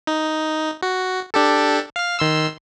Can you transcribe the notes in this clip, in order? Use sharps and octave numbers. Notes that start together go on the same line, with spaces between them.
D#4
F#4
D4 G4 A4
F5 F6
D#3 C6 E6